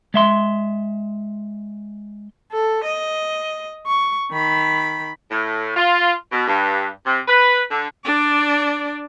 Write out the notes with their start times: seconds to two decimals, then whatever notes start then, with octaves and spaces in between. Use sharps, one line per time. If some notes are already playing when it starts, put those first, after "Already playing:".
0.14 G#3 E5 C6
2.52 A4
2.84 D#5
3.87 C#6
4.32 D#3 B5
5.31 A2
5.76 F4
6.32 B2
6.48 G2
7.06 C3
7.28 B4
7.71 D3
8.05 D4 D5